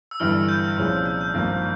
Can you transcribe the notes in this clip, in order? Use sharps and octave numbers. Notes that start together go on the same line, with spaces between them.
E6
G1 G2 E3 G3 F6
G6
C2 A#2 F3 G#3 C#4
G6
G6
G#1 G2 F3 A#3